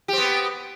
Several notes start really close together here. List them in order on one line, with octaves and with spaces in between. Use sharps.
G4 C4 B3